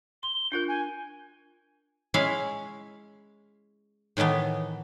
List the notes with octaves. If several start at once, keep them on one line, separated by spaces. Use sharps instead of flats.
C6 G7
D4 F4 A#4 G6
G#5
G#3 C#4 E4 F5
A2 D#3 E3 A3 B3